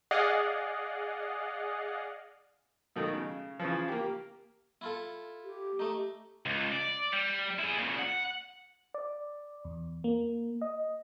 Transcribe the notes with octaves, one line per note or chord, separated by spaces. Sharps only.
G#4 D5 D#5 F5 F#5
C#2 B2 D#3 F#3 A3
C#3
C#3 E3 F3
A#3 G4
E4 F4 A4
G4
A3 D#4
C#2
D5
G3
E4 G#4
A#2 C#3
F#5
D5
E2
A#3
D#5